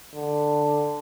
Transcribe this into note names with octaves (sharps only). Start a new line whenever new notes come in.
D3